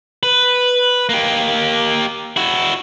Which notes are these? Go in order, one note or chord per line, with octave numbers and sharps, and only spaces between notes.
B4
A#3 G4
E4 F#4